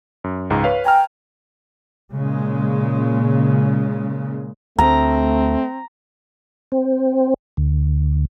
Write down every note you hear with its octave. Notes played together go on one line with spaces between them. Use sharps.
F#2
C#2 G#2 A#5
B4 C#5 F5
G5 G#5 A#5 F6
A#2 C#3 G#3
D2 A3 C4 A#5
C4
D2